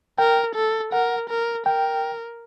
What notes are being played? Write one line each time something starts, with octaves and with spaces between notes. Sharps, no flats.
A#4 G5
A4
A#4 F#5
A#4
A#4 G5